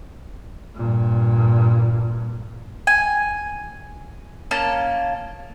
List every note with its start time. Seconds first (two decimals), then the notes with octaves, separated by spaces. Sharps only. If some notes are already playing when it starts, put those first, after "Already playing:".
0.75 G2 A#2
2.87 G#5
4.51 A#3 C#4 A5